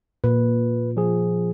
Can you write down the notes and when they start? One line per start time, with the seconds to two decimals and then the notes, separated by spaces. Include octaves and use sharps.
0.24 A#2 B4
0.97 F3 G#4